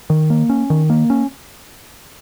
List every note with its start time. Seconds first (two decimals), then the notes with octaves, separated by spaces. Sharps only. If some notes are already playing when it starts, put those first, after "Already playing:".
0.10 D#3
0.30 A#3
0.49 C#4
0.70 D#3
0.90 A#3
1.10 C#4